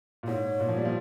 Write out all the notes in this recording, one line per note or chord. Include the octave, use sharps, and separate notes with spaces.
A#2
G#2 C#5
A#2
F3
G3
F3